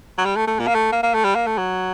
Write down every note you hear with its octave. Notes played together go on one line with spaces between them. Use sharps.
F#3
G3
A3
A3
A#2
A#3
A3
A#3
A#3
A3
G3
A#3
A3
F#3